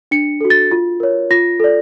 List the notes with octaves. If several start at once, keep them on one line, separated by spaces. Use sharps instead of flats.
D4 C#7
F#4 A4
A6
F4
A#4 C#5
F4 A#6
A4 D5